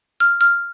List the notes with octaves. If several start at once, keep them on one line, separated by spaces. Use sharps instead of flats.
F6
F6